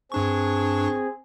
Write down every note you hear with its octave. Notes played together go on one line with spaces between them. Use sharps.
G2 C4 D4 G#4 C#6